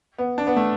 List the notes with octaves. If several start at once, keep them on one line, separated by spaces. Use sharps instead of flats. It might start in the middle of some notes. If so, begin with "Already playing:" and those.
B3
D4
B3
A3